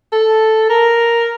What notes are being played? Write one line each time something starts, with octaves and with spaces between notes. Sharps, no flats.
A4
A#4